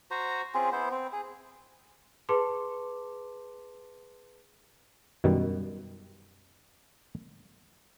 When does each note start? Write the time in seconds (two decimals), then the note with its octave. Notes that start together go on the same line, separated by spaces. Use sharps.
0.11 F#4 C5 A#5
0.54 C4 C#4 F4 G#4
0.72 B3 E4 C5
0.91 C4
1.13 G#4
2.29 G#4 B4 A5 C6 D6
5.24 F#2 B2 D#3 G3